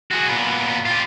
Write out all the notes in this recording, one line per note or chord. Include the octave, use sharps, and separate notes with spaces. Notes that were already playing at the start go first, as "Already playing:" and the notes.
F#4 G#4
A#2 B3
F4 G4